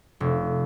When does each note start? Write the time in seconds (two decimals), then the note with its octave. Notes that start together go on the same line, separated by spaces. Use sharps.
0.20 F1